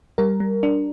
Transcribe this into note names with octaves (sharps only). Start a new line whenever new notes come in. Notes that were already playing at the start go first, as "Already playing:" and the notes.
G3 A#4
G3
D4